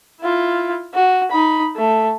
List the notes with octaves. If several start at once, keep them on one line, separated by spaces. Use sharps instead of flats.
E4 F4
F#4
D#4 B5
A3